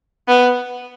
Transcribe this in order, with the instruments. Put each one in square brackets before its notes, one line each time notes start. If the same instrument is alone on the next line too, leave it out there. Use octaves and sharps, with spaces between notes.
[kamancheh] B3